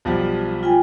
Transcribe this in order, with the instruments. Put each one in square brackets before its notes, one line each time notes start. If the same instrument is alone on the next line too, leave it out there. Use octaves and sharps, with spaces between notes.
[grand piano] B1 F3 G3
[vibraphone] F4 G5 G#5